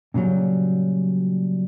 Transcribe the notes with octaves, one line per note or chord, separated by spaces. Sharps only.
A#2 C#3 E3 F#3 G3